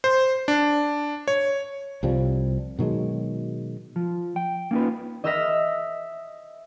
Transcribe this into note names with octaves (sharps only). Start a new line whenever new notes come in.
C5
D4
C#5
C2 C3 F3 G3
B2 D#3 F#3 G#3
F3
G5
A#3 C#4 D#4 F4 B4
D#5 E5 E6 F6 A#6 B6